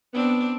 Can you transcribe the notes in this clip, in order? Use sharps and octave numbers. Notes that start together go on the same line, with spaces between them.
B3 C4 D4